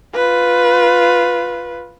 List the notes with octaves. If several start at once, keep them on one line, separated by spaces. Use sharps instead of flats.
F4 B4